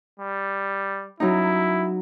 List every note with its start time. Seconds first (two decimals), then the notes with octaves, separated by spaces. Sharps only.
0.20 G3
1.20 F#3 C#4 D#4 E4